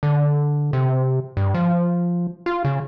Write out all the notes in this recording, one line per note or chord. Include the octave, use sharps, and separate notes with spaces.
D3
C3
G2
F3
F4
C#3